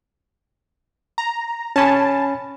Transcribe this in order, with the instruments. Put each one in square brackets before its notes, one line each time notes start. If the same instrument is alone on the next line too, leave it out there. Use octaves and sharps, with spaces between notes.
[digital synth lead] A#5
[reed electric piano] C#4 G#5 B5 [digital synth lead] A5